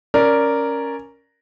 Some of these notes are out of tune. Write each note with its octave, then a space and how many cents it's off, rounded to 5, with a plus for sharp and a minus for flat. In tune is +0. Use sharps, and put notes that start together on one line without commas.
C#4 +0 A#4 +0 D5 -5